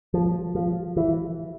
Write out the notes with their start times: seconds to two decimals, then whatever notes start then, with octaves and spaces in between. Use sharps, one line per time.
0.14 F3
0.55 F3
0.97 E3